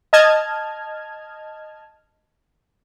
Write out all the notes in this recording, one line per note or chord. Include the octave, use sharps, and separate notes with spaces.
D#5 A5 F6 G#6